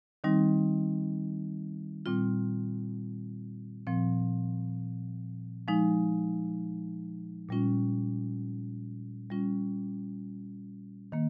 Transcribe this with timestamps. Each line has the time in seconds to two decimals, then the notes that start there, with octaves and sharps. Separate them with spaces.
0.24 D#3 G3 C4 D#4
2.06 A#2 G3 C4 F4
3.87 A#2 F3 C4
5.68 F3 G#3 D#4
7.49 A#2 G3 C#4 F4
9.31 G3 C#4 F4
11.12 D#3 A#3